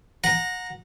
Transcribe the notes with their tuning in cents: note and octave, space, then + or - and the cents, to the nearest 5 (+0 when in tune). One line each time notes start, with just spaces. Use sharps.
F#5 -25 A#5 +0